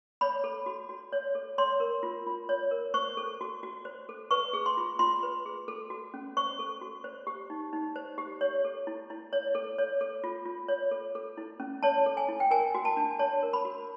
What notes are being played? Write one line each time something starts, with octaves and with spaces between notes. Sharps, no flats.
C#5 B5
A4
F#4
F#4
C#5
A4
C#5 C6
A#4
F4
F4
C#5
A#4
C5 C#6
A4
F#4
F#4
C5
A4
B4 C#6
G#4
C6
F4
F4 C6
B4
G#4
A4
F#4
C#4
C5 C#6
A4
F#4
C5
G4
D#4
D#4
C5
G4
C#5
A4
E4
E4
C#5
A4
C#5
A4
F4
F4
C#5
A4
A4
E4
C#4
C#5 A5
A4
G#5
E4
G5
A#4 G#5
F#4
A5
D4
C#5 A5
A#4
B5
F#4